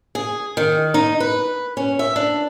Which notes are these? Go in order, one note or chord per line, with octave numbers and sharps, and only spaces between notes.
G#4
D#3
D#4
B4
C#4
E5
D4